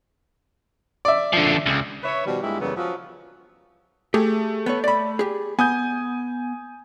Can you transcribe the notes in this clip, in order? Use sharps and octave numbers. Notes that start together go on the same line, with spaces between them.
D5 E5
D3 F3
C#2
B4 C#5 E5
B2 D#3 F3 G3
G2 G#3 A#3 E4 F4 G4
F#2 C#3 E3 F#3 G3 B3
F3 F#3 C#4
A3 G4 G#4
B3 C#5
D5 B5
G4 G#4
B3 G#5 D#6 G6